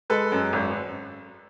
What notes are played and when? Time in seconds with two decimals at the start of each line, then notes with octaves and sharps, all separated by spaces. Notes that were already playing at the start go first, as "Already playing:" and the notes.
0.10 G#3 A4 B4
0.32 F#2
0.53 G#1